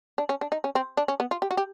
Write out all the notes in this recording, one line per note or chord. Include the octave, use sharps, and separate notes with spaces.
D4
C#4
D4
D#4
C#4
C4
D4
C#4
B3
F4
G4
F#4
G4